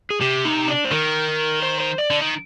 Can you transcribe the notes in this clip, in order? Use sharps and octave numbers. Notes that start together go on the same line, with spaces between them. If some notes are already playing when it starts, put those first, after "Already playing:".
G#4
C3 G4
D#4
D4
C5
D#3 A#4
C5
C5
D5
D3
D#3